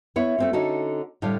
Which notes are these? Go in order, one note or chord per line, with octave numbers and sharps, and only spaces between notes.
B3 E4 C#5
A3 C4 F4
D3 C#4 D#4 F#4 A4
A2 D3 G3 A4 D5 F5